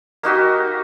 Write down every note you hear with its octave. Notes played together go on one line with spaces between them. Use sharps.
A#3 D#4 F#4 G4